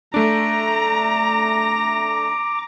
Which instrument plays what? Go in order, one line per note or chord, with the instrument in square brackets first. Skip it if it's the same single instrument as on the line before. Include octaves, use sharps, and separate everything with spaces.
[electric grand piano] A3 D4 [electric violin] A#5 [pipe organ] D6